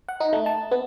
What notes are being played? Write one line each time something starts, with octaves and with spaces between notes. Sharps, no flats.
F#5
D#4
A3
A5
B3